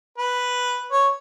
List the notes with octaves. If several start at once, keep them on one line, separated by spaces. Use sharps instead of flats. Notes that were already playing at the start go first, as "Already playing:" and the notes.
B4
C#5